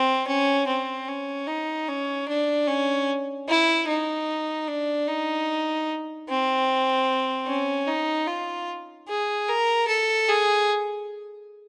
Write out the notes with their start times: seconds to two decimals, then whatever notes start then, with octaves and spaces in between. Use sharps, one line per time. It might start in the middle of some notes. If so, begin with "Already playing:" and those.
Already playing: C4
0.27 C#4
0.67 C4
1.08 C#4
1.47 D#4
1.88 C#4
2.28 D4
2.67 C#4
3.48 E4
3.88 D#4
4.68 D4
5.07 D#4
6.28 C4
7.47 C#4
7.87 D#4
8.27 F4
9.08 G#4
9.48 A#4
9.88 A4
10.28 G#4